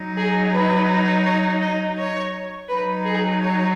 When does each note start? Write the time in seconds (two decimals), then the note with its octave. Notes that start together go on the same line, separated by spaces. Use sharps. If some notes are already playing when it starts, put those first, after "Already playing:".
Already playing: F#3 D#4
0.18 G#4
0.53 B4
1.25 C#5
1.61 D#5
1.98 C#5
2.69 F#3 D#4 B4
3.06 G#4
3.42 C#5